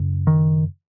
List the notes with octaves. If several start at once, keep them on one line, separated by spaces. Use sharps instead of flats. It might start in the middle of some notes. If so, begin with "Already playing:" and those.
Already playing: F#2 C#3
D#3